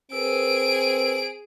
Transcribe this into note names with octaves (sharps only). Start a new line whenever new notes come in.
C4 G#4 A#4 B4 E6 D7